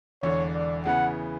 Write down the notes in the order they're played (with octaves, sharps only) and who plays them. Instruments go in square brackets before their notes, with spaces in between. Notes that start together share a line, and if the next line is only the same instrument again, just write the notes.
[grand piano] E1 E2 D3 [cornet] C#5
[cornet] D5
[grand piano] C#3 E3 B3 [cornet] F#5